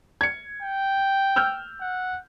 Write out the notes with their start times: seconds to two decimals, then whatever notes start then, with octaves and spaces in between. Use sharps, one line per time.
0.21 G#6 C#7
0.62 G5
1.36 E6 F6 G6
1.81 F#5